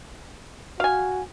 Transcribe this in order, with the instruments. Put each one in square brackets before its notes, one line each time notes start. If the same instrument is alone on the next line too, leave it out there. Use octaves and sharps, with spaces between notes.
[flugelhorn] F#4 [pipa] F5 G#5